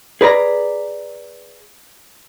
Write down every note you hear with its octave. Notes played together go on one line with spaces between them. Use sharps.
G#4 B4 D5 A#5